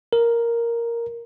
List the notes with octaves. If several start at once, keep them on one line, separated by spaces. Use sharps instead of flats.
A#4